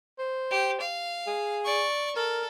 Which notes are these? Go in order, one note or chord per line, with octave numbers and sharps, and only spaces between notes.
C5
G4
F5
G#4
D5 C#6
A4 A#4